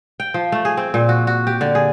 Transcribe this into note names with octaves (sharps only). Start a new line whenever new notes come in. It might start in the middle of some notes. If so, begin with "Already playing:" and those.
G5
F3
A3
G#4
C4
A#2
F#4
F#4
G4
D3
G#4